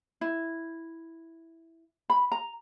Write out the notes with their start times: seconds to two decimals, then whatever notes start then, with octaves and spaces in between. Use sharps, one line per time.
0.21 E4
2.10 B5
2.32 A#5